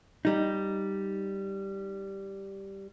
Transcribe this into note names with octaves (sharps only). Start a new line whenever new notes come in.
G3 D#4